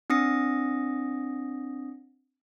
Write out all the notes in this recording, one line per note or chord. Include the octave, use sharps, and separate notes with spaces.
C4 D4 D#6 A#6 C#7